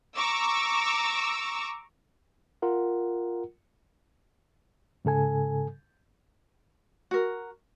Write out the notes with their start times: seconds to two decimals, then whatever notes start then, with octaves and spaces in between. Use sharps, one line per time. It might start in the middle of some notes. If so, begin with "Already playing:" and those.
0.16 A#5 C#6 D6 E6
2.62 F4 A#4 F#5
5.05 G#2 C#3 A4 G#5
7.11 F#4 A#4